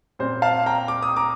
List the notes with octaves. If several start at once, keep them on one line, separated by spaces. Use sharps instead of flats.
A#2 G3 C4 C5
F5 A5
G5 A#5
D6
D#6
A#5 D6